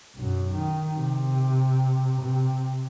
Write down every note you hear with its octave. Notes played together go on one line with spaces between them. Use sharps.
B1 F#2
D#3
C3
C3